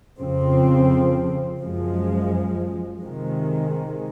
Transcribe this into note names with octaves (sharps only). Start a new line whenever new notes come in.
F2 C#3 F3 C4
F#2 F3 G#3
C3 D#3 G#3